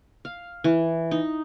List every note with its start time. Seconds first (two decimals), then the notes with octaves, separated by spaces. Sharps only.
0.25 F5
0.64 E3
1.11 D#4